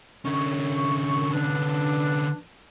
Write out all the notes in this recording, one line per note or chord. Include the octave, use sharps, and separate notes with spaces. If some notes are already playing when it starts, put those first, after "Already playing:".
F#2 D3 C#4 C#6
B3 D4